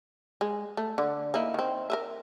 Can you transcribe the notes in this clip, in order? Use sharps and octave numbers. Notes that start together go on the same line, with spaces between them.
G#3
A3
D3
A#3 D#4 E4
D#3 C4
A#4 B4 E5